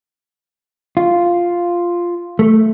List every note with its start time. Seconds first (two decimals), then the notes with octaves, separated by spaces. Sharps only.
0.97 F4
2.39 A3